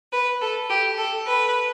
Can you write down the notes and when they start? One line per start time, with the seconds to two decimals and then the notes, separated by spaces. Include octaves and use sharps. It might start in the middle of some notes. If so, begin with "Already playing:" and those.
0.12 B4
0.40 A4
0.69 G4
0.97 A4
1.26 B4